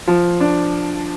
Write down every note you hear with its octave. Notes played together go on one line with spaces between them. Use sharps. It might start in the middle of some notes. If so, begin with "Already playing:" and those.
F3
D4